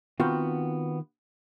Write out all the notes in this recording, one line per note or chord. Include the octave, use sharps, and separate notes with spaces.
D#3 B3 C4 F4 F#4 G5